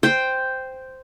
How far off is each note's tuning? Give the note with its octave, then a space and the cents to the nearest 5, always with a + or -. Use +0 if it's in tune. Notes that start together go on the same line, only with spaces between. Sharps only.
C5 -5 G5 +0